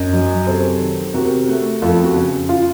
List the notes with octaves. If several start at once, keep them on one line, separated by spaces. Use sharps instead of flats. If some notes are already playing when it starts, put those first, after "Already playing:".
Already playing: F#2 D#5
F#3
C3 A4 C5
D#3
C3 F#4 A#4
A3
F2 F4 A4
F#4
C#3
F4